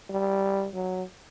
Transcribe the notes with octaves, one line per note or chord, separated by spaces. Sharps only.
G3
F#3